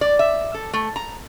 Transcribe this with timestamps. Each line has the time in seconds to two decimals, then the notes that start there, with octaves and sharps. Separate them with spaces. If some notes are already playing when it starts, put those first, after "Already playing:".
0.01 D5
0.19 E5
0.54 A4
0.73 A3
0.96 A#5